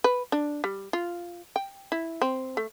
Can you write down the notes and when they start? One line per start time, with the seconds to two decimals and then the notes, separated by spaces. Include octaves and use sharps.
0.04 B4
0.32 D4
0.64 G3
0.93 F4
1.56 G5
1.92 E4
2.22 C4
2.57 A3